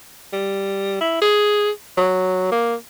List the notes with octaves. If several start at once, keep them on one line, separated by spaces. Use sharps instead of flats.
G3
E4
G#4
F#3
A#3